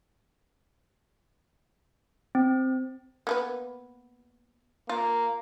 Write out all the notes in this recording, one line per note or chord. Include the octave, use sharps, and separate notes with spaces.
C4
A#3 B3 B4
A#3 F4